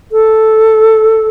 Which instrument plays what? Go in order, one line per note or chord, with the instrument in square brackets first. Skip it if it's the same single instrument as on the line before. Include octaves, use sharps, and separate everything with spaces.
[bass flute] A4